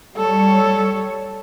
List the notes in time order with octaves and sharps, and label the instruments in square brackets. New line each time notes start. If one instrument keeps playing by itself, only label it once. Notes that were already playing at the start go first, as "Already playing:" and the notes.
[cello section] G3 C#5 [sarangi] A4